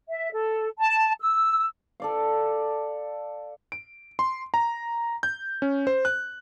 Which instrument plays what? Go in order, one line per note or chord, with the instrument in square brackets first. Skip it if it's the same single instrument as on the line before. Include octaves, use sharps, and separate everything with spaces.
[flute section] E5
A4
A5
E6
[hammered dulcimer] A4 D5 F5
[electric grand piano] D7
C6
A#5
G6
C#4
C5
F#6